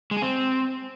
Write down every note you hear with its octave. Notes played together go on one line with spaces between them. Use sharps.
G#3
G#4
C4